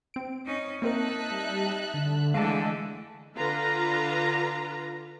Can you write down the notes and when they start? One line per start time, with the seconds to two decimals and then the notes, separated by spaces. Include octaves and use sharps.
0.14 C4 D7
0.46 C#4 D#4
0.82 A#3 C4 D#4 A#4 E5 A5 F#6
1.30 G3
1.94 D3
2.34 D3 E3 G#3 A3 A4 F5 A5
3.37 D3 F4 B4 A#5